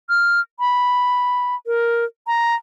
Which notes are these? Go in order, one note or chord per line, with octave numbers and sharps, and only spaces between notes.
F6
B5
A#4
A#5